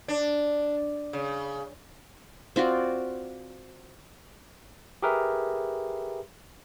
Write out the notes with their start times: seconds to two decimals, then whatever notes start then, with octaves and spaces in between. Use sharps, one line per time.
0.08 D4
1.13 C#3
2.56 C4 F4 F#4 D5
5.03 G4 G#4 A#4 B4 E5